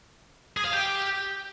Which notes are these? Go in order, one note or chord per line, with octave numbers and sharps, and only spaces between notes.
G#4
F5
G4